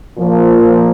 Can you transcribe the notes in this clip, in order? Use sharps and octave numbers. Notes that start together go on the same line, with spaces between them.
A#2 F3 A#3